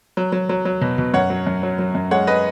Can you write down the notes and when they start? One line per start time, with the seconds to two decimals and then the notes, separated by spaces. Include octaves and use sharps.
0.17 F#3
0.32 F#3
0.49 F#3
0.65 F#3
0.81 B2
0.98 B2
1.14 F#2 C#5 F#5
1.30 F#3
1.47 F#2
1.63 F#3
1.79 F#3
1.95 F#2
2.11 G#3 C#5 F#5
2.27 G#3 B4 D#5